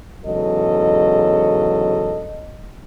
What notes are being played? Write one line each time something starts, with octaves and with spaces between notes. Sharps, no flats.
E2 G#2 C#3 F#3 A4 D#5